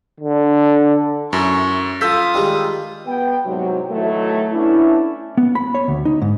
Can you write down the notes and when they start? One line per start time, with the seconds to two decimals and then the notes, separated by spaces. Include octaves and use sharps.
0.20 D3
1.33 F#2 E4 C#6
2.01 F4 A4 D#6 E6 G6 B6
2.34 D#3 G3 G#3
3.07 B3 G5
3.45 C2 G#2 C3 F#3
3.91 A2 D#3 E3 F#3 A3
4.53 A3 B3 C#4 D4 E4
5.38 B3
5.55 B5
5.75 C#5
5.88 D2
6.05 D#4
6.22 G#2